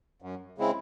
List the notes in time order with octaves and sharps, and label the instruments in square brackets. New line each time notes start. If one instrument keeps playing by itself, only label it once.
[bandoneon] F#2
C#3 G#3 C4 E4